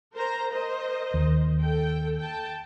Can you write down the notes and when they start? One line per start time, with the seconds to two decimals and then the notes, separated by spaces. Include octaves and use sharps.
0.14 A#4 C5 A#5
0.51 A#4 C5 D#5
1.14 D#2
1.62 A4 G5
2.19 G5 A5